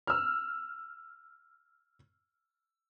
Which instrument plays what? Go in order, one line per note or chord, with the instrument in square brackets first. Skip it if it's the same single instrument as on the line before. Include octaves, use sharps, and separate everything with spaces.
[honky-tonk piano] E6 F6